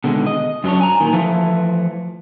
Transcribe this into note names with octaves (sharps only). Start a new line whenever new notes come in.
B2 D3 D#3 G3 G#3
D#5
F#2 F#3 D4 C#5
G#5 A#5
A#2 D#3
E3 F3 A3